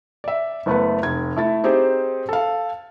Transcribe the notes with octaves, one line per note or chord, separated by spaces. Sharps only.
D5 E5
F#1 A3 B3 B4
F1 G#6
A3 E4 A6
C4 D#4 G4 G#4 C5
A4 F5